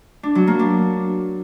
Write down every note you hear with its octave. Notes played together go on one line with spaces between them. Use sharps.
D4
F#3
A#3
D4